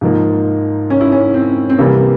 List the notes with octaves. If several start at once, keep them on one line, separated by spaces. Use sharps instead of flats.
G#2 F3 A#3
C#4
E4
C#4
C4
C4
C3 E3 G3 A#3